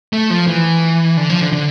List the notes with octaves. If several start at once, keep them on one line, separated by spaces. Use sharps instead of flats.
A3
F3
E3
D3
F3
D3
D3